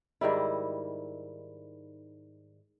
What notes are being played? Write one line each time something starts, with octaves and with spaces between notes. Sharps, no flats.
G#2 D#3 G3 E4